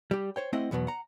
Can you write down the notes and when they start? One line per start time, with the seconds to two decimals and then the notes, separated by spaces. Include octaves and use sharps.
0.11 G3 G4
0.36 C5 C#5 G5
0.53 A3 C4 E4 C5 D#5 F#5
0.71 E2 B2 F#3 B3
0.87 F#5 A#5